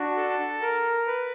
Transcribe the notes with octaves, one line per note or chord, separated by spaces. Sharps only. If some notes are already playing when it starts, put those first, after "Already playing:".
Already playing: D4 F#4
A4
A#4
B4